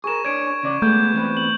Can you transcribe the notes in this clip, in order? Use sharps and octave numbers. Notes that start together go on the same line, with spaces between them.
G#4 A#4 C#6 E7
D4 C#5 G#6 D7
C#3 D5
G#3 A3 B3 G6
E2 C4 B4
F#7